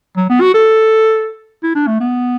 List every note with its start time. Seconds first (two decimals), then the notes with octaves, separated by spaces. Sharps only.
0.17 F#3
0.30 B3
0.41 F#4
0.54 A4
1.63 E4
1.76 D4
1.88 A3
2.00 B3